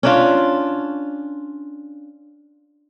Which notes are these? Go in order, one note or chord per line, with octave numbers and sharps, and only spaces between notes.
C#4 D4 F4